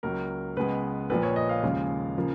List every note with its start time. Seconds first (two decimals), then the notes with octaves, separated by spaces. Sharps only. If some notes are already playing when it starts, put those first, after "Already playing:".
0.03 C#2 C#3 F#3 A#3 A#4
0.57 C#2 C#3 G#3 B3 B4
1.10 A#1 A#2 F3 B4
1.23 C#5
1.36 D#5
1.49 F5
1.63 D#2 C#3 F3 G#3
2.17 C#3 F3 A#3